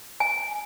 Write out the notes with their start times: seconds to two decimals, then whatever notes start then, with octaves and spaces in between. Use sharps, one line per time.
0.20 G#5